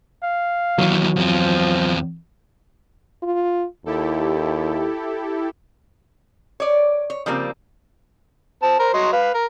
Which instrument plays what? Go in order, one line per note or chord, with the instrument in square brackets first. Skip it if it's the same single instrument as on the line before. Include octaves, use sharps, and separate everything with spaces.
[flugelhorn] F5
[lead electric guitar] D#2 E3 [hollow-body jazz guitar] F#3
[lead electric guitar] E2 C4 [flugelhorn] F3
[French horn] F4
[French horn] D#2 [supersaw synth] E4 G4 A4
[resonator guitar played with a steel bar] C#5 D5
C#5
C#3 F3 G3 A#3 C4
[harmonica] C4 A5
A#4 C5
F#3 D#5 C6
B4 F5
A#4